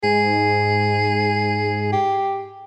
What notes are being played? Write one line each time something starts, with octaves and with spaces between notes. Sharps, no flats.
G#2 G#4
G4